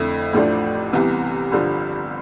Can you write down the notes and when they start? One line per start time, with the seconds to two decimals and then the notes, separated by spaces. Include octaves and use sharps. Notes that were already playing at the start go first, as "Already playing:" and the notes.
Already playing: F2 D3 A3 E4
0.33 A1 A2 F3 A3 D4
0.93 C2 C3 E3 B3
1.51 G1 G2 D3 F3